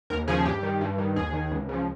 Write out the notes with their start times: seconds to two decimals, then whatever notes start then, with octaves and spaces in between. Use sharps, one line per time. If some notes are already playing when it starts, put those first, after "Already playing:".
0.10 D#2 A#4
0.27 C#3 F3 G#4
0.45 G2 G4
0.63 D#3
0.81 G2
0.98 D#3
1.16 D#2 G#4
1.33 D#3
1.51 C#2
1.69 C#3 F3